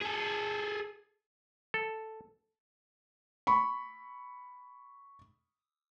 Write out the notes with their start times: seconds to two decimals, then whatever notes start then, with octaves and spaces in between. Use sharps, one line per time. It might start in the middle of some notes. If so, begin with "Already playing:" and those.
0.01 G#4 A4
1.74 A4
3.47 B5 C#6